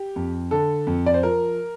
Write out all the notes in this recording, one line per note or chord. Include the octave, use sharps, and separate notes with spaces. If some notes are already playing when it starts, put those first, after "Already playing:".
Already playing: G4
F2
D3 A4
F2
D5
C5
F3 A#4